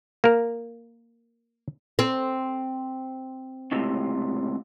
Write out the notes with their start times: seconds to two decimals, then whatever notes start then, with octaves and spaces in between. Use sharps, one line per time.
0.24 A#3 A#4
1.99 C4
3.72 C#2 A2 C3